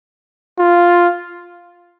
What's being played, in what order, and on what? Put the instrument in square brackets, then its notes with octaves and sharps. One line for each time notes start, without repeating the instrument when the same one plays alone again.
[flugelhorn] F4